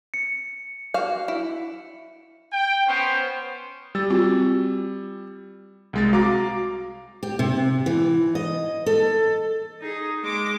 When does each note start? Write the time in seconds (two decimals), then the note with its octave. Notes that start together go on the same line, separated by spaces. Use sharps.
0.14 C#7
0.94 F#4 F5
1.28 E4
2.52 G5
2.87 B3 C#4 C5
3.95 G3 E6 A6
4.10 C4 F4 F#4
5.93 C2 G#3 A6
6.13 F#4 F5 A#5 D6
7.23 G4
7.39 C3
7.86 E3
8.35 D#5
8.86 A4
9.81 D#4 G#4
10.24 G#3 D6